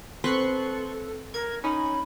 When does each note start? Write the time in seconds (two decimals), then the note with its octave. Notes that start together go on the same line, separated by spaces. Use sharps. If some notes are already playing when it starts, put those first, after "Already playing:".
0.24 C4 A4 B4 C6 C#6 F#6
1.34 A#4 G#6
1.64 C#4 D#4 B5